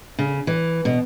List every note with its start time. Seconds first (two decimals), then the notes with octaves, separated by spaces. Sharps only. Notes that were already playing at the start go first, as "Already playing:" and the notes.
0.19 C#3
0.47 E3
0.85 B2